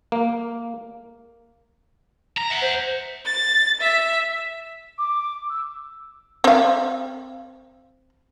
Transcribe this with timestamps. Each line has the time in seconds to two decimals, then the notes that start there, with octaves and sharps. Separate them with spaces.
0.12 A#3
2.37 A#5
2.50 E5 F#5
2.62 C5
3.25 A6
3.81 E5
4.98 D6
5.50 E6
6.44 C4 F5